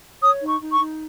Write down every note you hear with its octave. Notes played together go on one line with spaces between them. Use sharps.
C#5 D#6
D#4
C#6
D#4
C#6
D#4